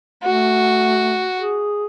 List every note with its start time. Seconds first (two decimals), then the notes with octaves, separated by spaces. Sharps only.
0.24 A3 F#4
1.36 G#4